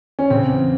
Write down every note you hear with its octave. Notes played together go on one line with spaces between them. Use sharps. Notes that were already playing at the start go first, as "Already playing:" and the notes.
C#4
C#3 C4
E2